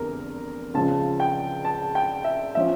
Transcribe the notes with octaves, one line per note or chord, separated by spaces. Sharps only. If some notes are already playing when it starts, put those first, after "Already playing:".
Already playing: F1 E2 D3 A#4
C#2 C#3 F3 A5
G5
A5
G5
E5
F3 C#4 E5